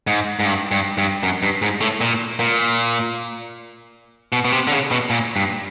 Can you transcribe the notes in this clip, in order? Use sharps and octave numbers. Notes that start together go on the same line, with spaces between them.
G#2
G#2
G2
G2
G2
F#2
G2
G#2
A2
A#2
A#2
B2
B2
C3
D3
C#3
B2
A#2
G2